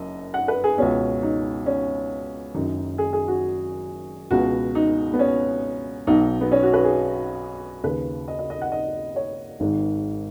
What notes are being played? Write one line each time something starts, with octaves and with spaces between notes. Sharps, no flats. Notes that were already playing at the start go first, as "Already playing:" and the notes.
Already playing: F#1 F#2 D#5
F#5
B4
G#4
C#2 B2 C#4
D#4
C#4
F#1 F#2 D#3 D#4
G#4
G#4
F#4
C#2 B2 F#4
D#4
B3
C#4
B1 B2 D#4
B3
C#4
F#4
B4
G#4
D#2 C#3 B4
D#5
D#5
D#5
F#5
D#5
C#5
G#1 G#2 D#3